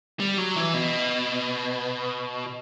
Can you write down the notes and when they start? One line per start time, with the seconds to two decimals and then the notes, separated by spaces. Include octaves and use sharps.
0.20 G3
0.38 F#3
0.56 E3
0.74 B2